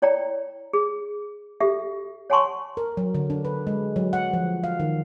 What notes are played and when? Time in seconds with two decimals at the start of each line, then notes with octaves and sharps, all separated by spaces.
0.02 E4 C#5 D5 G5 A#5
0.73 G#4
1.60 F#4 G4 A4 E5
2.30 C#5 F#5 G#5 A5 C6 C#6
2.77 A#4
2.97 F#3
3.14 D3
3.30 D4
3.45 B4
3.67 G#3
3.96 F#3
4.13 F#5
4.33 F3
4.64 F5
4.80 D#3